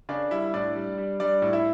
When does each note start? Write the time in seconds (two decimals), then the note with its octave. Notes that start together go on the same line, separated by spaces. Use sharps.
0.09 C#3 D4 D5
0.31 G3 E4 E5
0.54 A2 D4 D5
0.75 G3
0.98 G3
1.20 G3 D4 D5
1.42 A2
1.53 E4 E5